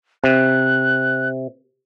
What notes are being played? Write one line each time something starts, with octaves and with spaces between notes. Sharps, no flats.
C3 F#6